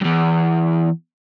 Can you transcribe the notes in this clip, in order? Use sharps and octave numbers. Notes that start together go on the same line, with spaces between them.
E2 G2